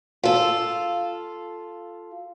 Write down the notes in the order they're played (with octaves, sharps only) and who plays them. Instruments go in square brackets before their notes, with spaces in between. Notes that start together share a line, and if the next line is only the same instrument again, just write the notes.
[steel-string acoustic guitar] F4 A4